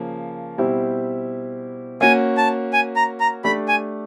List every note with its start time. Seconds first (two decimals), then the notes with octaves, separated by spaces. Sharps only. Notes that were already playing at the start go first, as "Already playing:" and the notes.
Already playing: C#3 F3 A#3
0.58 B2 G3 C4 E4 G4
2.01 A#3 C#4 F#4 G#5
2.37 A5
2.73 G#5
2.96 A#5
3.20 A#5
3.44 A3 D4 G4 B5
3.68 G#5